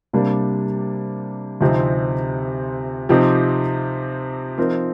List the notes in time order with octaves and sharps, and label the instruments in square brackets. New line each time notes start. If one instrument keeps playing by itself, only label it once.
[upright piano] C3 G3 A#3 D4
D2 C3 F3 C4 D#4
C3 F3 C4 D#4 G4
F3 C4 D#4 A#4